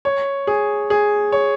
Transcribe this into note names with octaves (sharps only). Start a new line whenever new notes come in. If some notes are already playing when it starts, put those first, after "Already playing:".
C#5
G#4
G#4
C#5